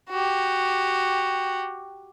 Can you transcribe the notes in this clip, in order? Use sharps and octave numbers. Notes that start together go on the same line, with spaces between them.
F#4 G4